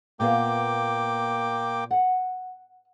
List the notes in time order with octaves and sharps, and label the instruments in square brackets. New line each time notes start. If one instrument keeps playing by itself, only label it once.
[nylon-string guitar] A#2 B3 F5 [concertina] A#3 G5 D6
[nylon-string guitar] F#5